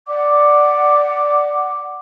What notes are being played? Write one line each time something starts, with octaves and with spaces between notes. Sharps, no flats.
D5 F#5 D6